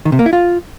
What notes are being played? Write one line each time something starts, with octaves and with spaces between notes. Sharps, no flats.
D#3
C3
A#3
E4
F4